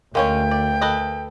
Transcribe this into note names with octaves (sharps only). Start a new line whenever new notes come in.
D2 G#3 C#4 A#4 C#5 F5 G5
D5
A4 B4 D#5